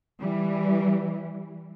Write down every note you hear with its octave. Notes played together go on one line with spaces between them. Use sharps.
E3 G3